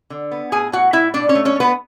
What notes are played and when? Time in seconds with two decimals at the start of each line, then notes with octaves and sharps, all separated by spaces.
0.10 D3
0.31 B3
0.52 A2 G#4 G#5
0.72 A2 F#4 F#5
0.93 A2 E4 E5
1.14 B2 D4 D5
1.29 C#4 C#5
1.35 A3
1.45 C#4 C#5
1.56 A3 B3 B4